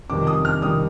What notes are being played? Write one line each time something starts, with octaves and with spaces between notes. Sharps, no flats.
F2 C3 D#3 G3 D6
D#6
F6
C3 D#3 G3 D#6